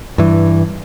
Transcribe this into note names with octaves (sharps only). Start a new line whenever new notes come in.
G2 E3